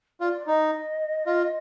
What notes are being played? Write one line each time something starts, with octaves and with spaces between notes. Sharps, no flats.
F4 D5
D#4 D#5
F4